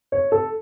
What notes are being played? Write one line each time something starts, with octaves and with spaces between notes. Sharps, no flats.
C#5
A4